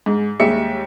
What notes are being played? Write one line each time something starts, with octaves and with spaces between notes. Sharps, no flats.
G#2
D#2 G3 G#3 E5 C#7